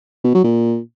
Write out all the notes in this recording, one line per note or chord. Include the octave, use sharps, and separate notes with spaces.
B2
F#3
A#2